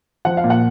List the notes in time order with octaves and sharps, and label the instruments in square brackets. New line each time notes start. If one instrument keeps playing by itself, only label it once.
[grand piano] F3 F#5
F5
A#2
F#5